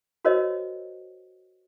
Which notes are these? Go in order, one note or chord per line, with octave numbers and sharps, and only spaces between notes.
F#4 A#4 C5 C#5 D#5